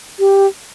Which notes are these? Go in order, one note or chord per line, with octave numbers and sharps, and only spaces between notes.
G4